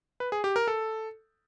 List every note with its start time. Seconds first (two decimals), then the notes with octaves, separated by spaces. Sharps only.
0.20 B4
0.32 G#4
0.44 G4
0.56 A#4
0.68 A4